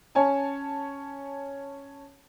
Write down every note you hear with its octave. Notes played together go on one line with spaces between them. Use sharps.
C#4 C#5 G#5 A5